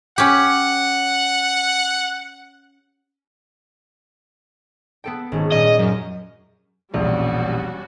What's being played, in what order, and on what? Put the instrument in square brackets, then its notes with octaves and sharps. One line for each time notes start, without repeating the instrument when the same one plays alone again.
[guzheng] C#4 G4 [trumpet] F#5
[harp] B3 A4 G5
G#1 C#4
[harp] A#2 G3 C#4 [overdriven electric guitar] D#5
[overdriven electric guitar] F#2
[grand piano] E1 A#1 [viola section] G3 C#4 F#4